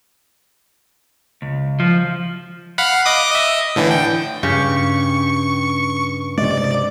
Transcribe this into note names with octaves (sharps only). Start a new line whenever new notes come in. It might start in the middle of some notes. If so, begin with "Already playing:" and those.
C#2
F3
F5 F#5 B5
D#5 D6 D#6
D#5 E5
A2 D3 E3
G5
G2 C#3 G4 C#6
C3 G#3 D5